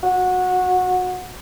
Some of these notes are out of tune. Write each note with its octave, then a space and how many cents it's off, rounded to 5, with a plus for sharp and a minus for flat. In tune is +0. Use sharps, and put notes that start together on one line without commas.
F#4 -20